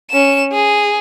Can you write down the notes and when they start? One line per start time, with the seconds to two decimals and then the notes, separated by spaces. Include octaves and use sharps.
0.10 C#4 E7
0.53 G#4